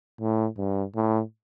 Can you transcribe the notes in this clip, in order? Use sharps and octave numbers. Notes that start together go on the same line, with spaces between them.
A2
G2
A2